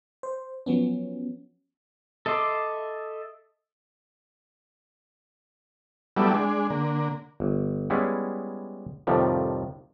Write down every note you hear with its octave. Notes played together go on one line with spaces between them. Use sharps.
C5
F3 F#3 B3 C#4
A4 D#5 E5 C6 D6
F#3 G3 A3 B3 E4 D5
G#3 D4
D3 A#3
G1
G3 G#3 B3 C#4 E4 G#4
F2 A2 C3 D#3 F3 G3